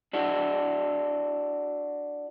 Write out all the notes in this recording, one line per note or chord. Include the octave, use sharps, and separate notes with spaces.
D4 E4 F#4